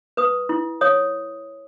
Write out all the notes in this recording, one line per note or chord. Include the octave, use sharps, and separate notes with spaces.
B4 D#6
E4
C#5 D#6